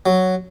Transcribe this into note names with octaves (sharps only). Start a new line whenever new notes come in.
F#3